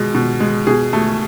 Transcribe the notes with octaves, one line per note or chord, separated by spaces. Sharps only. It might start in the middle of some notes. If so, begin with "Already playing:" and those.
Already playing: B2 G#3
B2
G#3
B2 G#4
A3